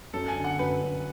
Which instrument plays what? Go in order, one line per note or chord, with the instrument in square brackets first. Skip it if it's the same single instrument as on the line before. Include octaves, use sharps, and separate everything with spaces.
[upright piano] F#2 [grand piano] A4
[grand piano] G#5
[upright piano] D3
[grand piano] F#5
[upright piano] F#2 [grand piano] B4
[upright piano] F#2